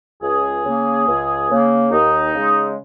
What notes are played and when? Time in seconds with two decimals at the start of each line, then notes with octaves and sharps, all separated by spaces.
0.22 C#2 G#4
0.63 C#3 A#3
1.07 C#2
1.49 C#3 A#3
1.91 D#2 D#4
2.33 C#3 G#3